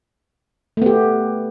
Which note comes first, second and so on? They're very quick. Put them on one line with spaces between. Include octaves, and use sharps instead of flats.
A3 B3 G4